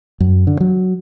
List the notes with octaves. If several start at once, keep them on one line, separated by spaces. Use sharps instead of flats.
F#2
D3
F#3